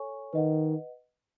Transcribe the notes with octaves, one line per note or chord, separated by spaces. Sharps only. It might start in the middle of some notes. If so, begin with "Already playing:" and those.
Already playing: A4 C#5 G#5 C#6
D#3 B4 D#5 F#5